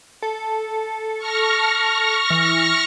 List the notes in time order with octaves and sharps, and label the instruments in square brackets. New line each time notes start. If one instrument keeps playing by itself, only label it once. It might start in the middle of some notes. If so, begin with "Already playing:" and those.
[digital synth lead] A4
[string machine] C#6 F6 A#6
[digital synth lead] E3